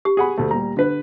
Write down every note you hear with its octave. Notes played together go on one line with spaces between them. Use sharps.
G4
G#4 F#5 B5
D2 A3
A#2 G3 A#5
D3 B4